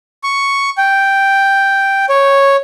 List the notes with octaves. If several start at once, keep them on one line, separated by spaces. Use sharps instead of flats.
C#6
G5
C#5